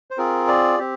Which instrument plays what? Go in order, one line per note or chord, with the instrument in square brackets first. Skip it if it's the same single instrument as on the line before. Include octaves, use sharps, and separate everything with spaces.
[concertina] C5
C4 F4 G#4 A#4
D5
C4 G4